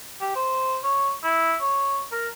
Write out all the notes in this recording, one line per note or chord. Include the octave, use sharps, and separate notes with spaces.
G4
C5
C#5
E4
C#5
A#4